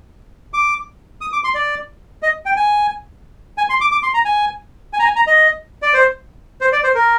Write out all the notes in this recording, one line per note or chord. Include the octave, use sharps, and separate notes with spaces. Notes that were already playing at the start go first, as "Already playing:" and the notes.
D6
D#6
D6
C6
D5
D#5
G5
G#5
G#5
C6
D6
D6
C6
A#5
G#5
G#5
A#5
G#5
A#5
D#5
D5
C5
C5
D5
C5
A#4